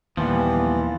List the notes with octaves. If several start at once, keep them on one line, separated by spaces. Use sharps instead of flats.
D#2 A#2 E3 F3 G3 B3